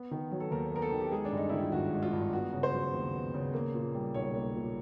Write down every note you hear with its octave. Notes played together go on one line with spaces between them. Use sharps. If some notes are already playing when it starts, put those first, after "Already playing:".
Already playing: B3
D#3
F#3
A4
D#2 A#4
B3 A#4
A4
D#3
G4
G#3 G#4
D4
G2
D#4
D#3 E4
F4
G#1 F#4
G#3
F4
G2
B3 F#4
C#3
C5
F#3
D#2
B3
C#3
A#3
A#2
G3
B1 C#5
A#3
A#2